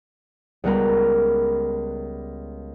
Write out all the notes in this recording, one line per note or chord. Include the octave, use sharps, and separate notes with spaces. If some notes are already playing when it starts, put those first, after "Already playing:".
C#2 G3 B3 A#4 B5